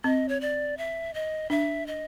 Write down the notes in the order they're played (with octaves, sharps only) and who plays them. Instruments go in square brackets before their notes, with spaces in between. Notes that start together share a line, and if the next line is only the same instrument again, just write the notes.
[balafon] C4 [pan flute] D#5
[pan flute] C#5
D5
E5
D#5
[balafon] D4 [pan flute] E5
[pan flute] D#5